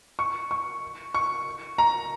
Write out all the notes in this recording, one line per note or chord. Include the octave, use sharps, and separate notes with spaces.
C#6
C#6
C#6
A#5